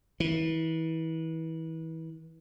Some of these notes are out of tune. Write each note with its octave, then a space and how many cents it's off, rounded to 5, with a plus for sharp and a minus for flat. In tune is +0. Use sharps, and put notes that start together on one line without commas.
E3 -30